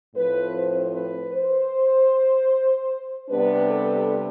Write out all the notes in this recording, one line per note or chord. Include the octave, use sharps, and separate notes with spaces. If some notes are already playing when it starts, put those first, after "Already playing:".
A2 F3 C4 B4
C5
B4
C5
C3 G3 B3 D4 B4
A4